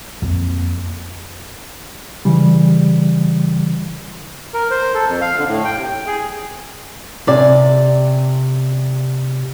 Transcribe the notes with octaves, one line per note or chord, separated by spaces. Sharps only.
F2 A#3
C#3 E3 G3
A#4
C5
A4
F2
F5
D3
A2
G5
C3
G5
G#4
C3 D5 G#5